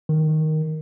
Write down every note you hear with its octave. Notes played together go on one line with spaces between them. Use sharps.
D#3